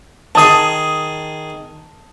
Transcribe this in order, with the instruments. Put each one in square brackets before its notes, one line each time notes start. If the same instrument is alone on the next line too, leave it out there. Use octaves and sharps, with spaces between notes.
[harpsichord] D#3 G#4 [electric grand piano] A5 D#6